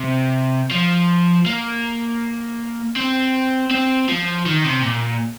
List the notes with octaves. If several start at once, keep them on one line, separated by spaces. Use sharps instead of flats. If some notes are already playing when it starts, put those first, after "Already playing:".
Already playing: C3
F3
A#3
C4
C4
F3
D#3
C3
A#2